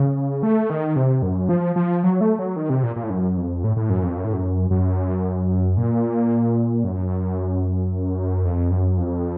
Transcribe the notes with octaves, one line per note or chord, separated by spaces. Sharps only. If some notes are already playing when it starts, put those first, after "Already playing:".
Already playing: C#3
A3
D#3
C3
F#2
F3
F3
F#3
A3
F#3
D#3
C3
A#2
A#2
A2
F#2
F2
A2
A2
F#2
F2
F#2
A2
F#2
F#2
A#2
F#2
F2
F#2
F2